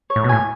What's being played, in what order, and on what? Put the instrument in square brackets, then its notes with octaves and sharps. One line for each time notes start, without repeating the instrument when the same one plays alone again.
[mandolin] C#5
[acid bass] A2
B2
[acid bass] A2 [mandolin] G#5